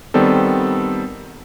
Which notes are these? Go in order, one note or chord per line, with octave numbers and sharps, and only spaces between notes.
D#3 G3 B3 C4 A4